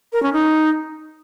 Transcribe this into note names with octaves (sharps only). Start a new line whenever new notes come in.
A#4
C#4
D#4